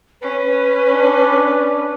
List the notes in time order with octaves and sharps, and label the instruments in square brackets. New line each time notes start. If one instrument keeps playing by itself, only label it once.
[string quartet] C#4 [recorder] B4
[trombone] D4